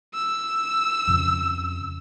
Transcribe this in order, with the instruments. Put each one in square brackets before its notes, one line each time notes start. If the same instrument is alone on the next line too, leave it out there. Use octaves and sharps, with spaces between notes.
[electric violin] E6
[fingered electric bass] F2 C#3 F3